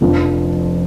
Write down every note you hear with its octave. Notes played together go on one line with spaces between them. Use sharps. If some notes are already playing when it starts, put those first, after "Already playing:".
F1 F2 F3 D4